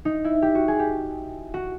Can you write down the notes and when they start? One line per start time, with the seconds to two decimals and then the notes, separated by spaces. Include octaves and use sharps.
0.05 D#4
0.24 E4
0.42 G4
0.55 F#4
0.68 G#4
0.79 G4
1.54 F#4